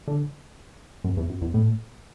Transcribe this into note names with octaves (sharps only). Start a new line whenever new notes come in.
D3
F#2
E2
F#2
E2
A2